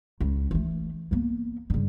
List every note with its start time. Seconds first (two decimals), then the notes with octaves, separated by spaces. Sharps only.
0.20 C#2
0.51 E3 A3
1.11 A#3 B3
1.70 G2 C#3